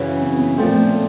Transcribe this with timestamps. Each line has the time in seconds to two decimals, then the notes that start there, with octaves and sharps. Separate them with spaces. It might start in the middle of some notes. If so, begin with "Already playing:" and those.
Already playing: F#2 C#3 E3 C#4
0.21 C4
0.39 B3
0.58 A#2 F3 A3 C4